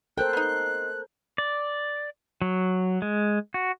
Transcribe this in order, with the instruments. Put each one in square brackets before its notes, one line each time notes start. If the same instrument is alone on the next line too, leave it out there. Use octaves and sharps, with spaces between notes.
[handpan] A4 A#4 C5 [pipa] G5 [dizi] F#6
[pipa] B3 D#4
[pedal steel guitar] D5
F#3
G#3
F#4